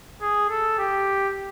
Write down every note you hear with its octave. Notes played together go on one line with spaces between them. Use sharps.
G#4
A4
G4